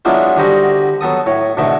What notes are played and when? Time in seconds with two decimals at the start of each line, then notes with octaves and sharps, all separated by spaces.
0.05 F#3 G#3 B3 D4 E4 F4
0.37 D3 G3 F#4 C5 D#5 B5
1.01 F#3 B3 A4 D#6
1.26 A2 C#5
1.57 G#2 B2 D3 A3 B3